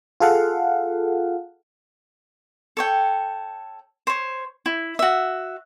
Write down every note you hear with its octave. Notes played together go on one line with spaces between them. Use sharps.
F4 G#4 A4 F5 F#5
A4 C#5 G5
C5 C#5
E4
F#4 E5